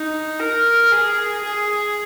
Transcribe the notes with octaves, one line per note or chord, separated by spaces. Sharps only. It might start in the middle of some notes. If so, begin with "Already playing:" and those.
Already playing: D#4
A#4
G#4
G#4